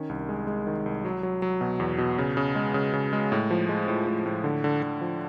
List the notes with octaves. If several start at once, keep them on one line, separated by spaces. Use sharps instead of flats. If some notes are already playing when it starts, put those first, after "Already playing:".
Already playing: D#3 C#4
C2
G#3
G#3
D#3
C2
F#3
F#3
F#3
B2
E2
B2
C#3
C#3
G#3
C#3
C#3
G#3
A2
F3
G#3
A2
A2
A2
D3
D3
D3
F3